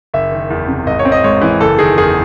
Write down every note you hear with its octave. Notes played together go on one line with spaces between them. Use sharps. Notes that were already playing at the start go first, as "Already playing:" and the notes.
F#1 E5
D#3
E2
C3
G#1 D#5
C#5
C4
D#5
G#2 C#5
E3
F#1 A4
D#3 G#4
E2 G#4